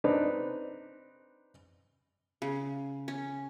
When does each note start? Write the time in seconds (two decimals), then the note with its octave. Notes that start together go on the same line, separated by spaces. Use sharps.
0.04 C4 D4 D#4 B4
2.42 C#3
3.08 C#4